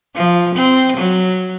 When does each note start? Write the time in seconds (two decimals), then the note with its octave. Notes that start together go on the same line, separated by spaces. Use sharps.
0.15 F3
0.55 C4
0.97 F#3